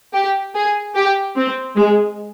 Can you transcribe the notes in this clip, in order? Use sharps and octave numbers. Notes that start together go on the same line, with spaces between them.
G4
G#4
G4
C4
G#3